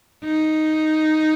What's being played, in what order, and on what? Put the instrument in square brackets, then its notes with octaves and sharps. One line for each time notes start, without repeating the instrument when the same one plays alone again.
[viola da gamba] D#4